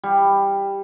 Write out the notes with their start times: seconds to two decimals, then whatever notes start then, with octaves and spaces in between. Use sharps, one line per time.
0.04 G3